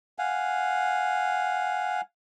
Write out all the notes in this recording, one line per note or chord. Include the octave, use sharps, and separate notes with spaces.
F5 F#5 G#5